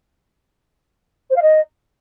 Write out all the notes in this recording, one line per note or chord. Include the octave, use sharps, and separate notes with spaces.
C5
F5
D#5